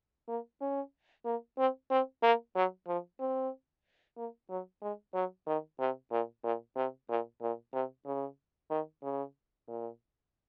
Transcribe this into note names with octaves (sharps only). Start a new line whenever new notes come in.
A#3
C#4
A#3
C4
C4
A#3
F#3
F3
C4
A#3
F#3
G#3
F#3
D#3
C3
A#2
A#2
C3
A#2
A#2
C3
C#3
D#3
C#3
A#2